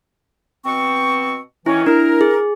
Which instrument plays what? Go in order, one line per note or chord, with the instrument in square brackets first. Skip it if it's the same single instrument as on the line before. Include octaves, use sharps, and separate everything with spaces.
[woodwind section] B2 C4 C#6
[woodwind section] D#3 E3 C#4 [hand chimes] E4
[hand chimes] D4 E4 [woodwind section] A#4
[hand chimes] G#4